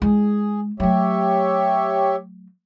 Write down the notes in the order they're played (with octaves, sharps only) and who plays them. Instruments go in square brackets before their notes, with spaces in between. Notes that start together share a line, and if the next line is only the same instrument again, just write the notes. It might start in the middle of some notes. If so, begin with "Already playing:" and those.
[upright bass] G#3 E4 [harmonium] G#4
[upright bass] F#3 A3 [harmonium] G4 C#5 E5